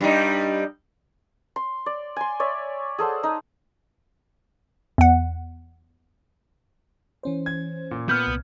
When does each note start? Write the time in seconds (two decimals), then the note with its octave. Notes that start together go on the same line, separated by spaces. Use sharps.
0.01 G2 G3 D#4
1.56 C6
1.86 D5
2.16 G#5 C6
2.40 C#5 D5 E5
2.98 G#4 A4 C5 F#5
3.23 D#4
4.98 E2 F#5
7.23 E3 C#4 C5
7.46 G#6
7.91 A#2
8.09 B3 F6 G6
8.27 C2